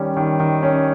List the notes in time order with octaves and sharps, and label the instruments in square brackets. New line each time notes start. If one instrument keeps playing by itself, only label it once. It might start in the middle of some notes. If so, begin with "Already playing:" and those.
Already playing: [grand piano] D#3 G3 C#4
D#3
D#3
C#4